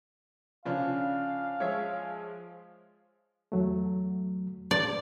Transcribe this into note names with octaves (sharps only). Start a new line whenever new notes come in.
C#3 F3 C#4 D4 F4 F5
F3 G#3 C#5 E5
E2 F#3 A3
D5